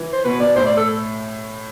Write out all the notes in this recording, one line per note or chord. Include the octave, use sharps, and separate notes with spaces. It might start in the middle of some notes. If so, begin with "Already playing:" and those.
Already playing: E3
C5
B2 B4
B2 D5
A2 C5
D5
A4